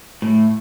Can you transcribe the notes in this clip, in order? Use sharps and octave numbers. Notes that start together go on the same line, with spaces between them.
A2